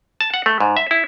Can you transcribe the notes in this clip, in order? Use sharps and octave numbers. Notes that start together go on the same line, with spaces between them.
A5
F#5
A3
G#2
E5
E4